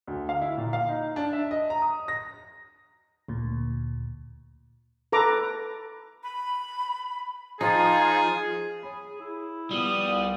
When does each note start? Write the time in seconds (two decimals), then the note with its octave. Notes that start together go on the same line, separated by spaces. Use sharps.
0.07 D2
0.29 F5
0.41 E4
0.57 A#2
0.73 F5
0.88 D#4
1.16 D4
1.33 E5
1.51 D#5
1.70 A#5
1.82 D#6
2.08 A#6
3.28 D2 A#2
5.12 A4 B4 A#5 D6
6.23 B5
7.61 F3 D#4 F4 G#4
8.83 G#4 C#5 B5
9.21 E4
9.71 F3 G3 B3 D#6
10.02 C2